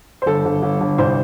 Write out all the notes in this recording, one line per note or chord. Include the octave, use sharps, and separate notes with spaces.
C5
G1 A4
G1
G1
G1
C2 C5